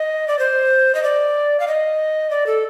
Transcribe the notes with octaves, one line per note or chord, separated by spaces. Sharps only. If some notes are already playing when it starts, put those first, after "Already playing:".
Already playing: D#5
D5
C5
D#5
D5
F5
D#5
D5
A4